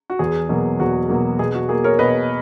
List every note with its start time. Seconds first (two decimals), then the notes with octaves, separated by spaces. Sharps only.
0.10 F#4
0.19 E2 G#4
0.49 B2 F#3 A#3
0.79 E2 F#4
1.09 B2 F#3 A#3
1.39 B2 G#4
1.54 F#4
1.69 A#3 G#4
1.84 A#4 C#5
1.99 B2 B4 D#5